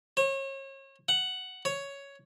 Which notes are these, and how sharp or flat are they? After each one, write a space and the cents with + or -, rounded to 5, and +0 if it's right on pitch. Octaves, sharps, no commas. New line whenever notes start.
C#5 -35
F#5 +5
C#5 +5